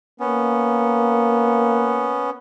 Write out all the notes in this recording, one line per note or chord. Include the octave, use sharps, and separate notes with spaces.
A#3 B3 C#4